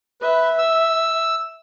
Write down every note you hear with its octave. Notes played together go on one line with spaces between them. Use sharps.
B4 E5
E6